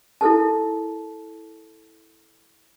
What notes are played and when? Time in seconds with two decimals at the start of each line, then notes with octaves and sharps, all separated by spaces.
0.21 E4 A4 A#4 A5